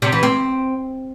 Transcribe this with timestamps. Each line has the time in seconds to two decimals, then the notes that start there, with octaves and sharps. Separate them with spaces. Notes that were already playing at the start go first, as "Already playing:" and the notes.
0.02 C3
0.12 E3
0.23 C4